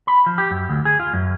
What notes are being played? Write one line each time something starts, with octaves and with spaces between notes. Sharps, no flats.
B5
F3
G4
F#2
D2
G#4
F4
F#2